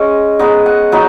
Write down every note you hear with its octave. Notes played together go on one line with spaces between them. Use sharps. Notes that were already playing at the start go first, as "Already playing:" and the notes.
Already playing: G#3 C#4 D#5
G#3 B3 D#4 D#5
F#5
F#3 B3 D#4 D#5